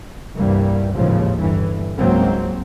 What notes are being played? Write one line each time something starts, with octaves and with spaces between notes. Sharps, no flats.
C2 G2 E3 G3 A#3
A1 D#2 G#2 C#3 F3
G1 G2 E3
C#2 G#2 F#3 A#3 C4